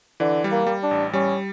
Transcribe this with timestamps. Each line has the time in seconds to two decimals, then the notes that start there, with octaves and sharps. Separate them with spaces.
0.20 D3 E3
0.44 G3
0.52 A#3
0.67 G3
0.83 D4
0.91 A1
1.13 G3 C#4